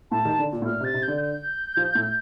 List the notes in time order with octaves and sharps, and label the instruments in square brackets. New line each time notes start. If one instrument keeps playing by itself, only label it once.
[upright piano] A2 [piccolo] A5
[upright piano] D#3
D3
A#2
A2
[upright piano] A#2 [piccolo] F6
[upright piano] C3
[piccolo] A6
[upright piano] C3
[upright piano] D3 [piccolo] G6
[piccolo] G6
[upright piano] F3
A2